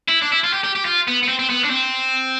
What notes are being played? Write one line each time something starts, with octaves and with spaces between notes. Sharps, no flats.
E4
D4
E4
F4
G4
G4
G4
F4
B3
B3
C4
C4
B3
D4
C4